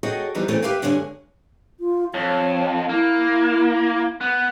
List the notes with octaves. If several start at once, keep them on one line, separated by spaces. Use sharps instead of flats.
F#4 G#4 A4 C#5 D#5 G5
D#2 E3 F3 G3 B3 D#4
F#2 C#3 E3 A3 C4 C#4
G4 B4 E5 F5 G5
G2 D3 G#3 C#4 G#5
F4
F2 C#5
A#3 E4
B3